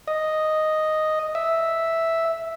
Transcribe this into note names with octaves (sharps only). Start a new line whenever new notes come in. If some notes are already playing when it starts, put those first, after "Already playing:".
D#5
E5